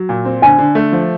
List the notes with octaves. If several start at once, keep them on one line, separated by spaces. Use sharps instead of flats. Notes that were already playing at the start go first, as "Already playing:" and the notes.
Already playing: F#3
A#2
C4
D3 G#5
D3
A3
F3